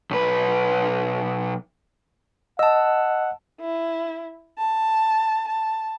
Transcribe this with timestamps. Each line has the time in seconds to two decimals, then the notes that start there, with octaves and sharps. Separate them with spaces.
0.11 B1 B4
2.59 D#5 F#5 A5 E6
3.61 E4
4.58 A5
5.48 A5